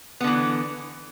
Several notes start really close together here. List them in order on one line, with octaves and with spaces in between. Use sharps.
B3 D3 E3